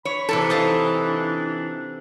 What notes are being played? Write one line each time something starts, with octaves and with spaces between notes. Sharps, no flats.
C#5 B5
C3 E3 A4 A#4 G#5
D#4 F5 A5
D4